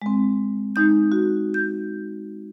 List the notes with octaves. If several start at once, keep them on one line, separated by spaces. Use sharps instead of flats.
G#3 C4
G#3 D#4 G6
F#4
G6